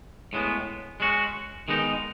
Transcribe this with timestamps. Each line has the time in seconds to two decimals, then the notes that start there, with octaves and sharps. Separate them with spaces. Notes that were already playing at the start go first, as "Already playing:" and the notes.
0.33 A2 G#3 B3
1.00 G#3 C#4 F#4
1.68 D#3 G#3 B3 D#4